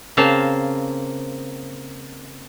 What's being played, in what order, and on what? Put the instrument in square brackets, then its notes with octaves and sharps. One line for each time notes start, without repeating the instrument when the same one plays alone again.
[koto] C#3 A#3 C4 C5 F5 A5